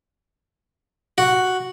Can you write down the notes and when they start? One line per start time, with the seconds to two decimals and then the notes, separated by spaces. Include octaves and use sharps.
1.18 F#4